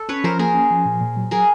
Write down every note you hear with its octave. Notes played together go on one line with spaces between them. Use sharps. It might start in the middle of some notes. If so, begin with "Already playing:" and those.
Already playing: A4
C#4 B4 C#5
F3 A#4 C5
A#3 G#4 A#4
C#4
F3
A#2
A#2
F#3
F#3 G#4 A#4